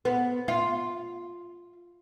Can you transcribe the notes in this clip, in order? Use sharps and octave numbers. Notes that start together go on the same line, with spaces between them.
B3
F4